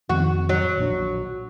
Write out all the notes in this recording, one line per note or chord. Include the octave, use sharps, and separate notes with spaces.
F2 D#3 C4 F#4
F#3
A#1 A#2 D4